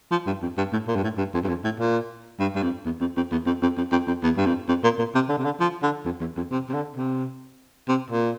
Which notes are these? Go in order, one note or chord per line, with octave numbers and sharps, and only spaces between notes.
F3
G2
F2
G2
A2
A#2
G2
A2
G2
F2
G2
F2
A2
A#2
G2
G2
F2
E2
F2
F2
E2
F2
F2
F2
F2
F2
E2
G2
F2
F2
A#2
A#2
C3
D3
C3
D3
F3
D3
F2
E2
F2
C3
C3
D3
C3
C3
A#2